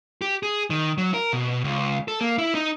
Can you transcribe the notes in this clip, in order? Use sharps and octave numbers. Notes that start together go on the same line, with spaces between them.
G4
G#4
D#3
F#3
A#4
B2
C#2
A4
A#3
E4
D#4